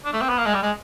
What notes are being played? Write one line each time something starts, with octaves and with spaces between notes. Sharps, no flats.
D4
A3
C4
B3
A#3
G#3
G3
G#3